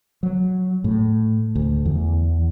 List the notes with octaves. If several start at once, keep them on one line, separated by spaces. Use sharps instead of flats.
F#3
A2
D2
E2